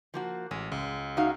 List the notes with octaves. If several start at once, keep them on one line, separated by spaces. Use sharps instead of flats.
F3 A#3 F#4
A1 G#3
C#2
D#4 F#4 F5